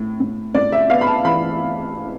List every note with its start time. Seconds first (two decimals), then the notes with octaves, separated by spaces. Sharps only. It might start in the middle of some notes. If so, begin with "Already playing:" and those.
Already playing: A2
0.20 A2
0.54 A2 D5
0.72 E5
0.90 B3 F5
1.01 B5
1.07 A5
1.25 E3 B5